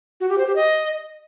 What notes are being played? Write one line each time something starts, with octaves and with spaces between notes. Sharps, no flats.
F#4
G4
C5
G4
D#5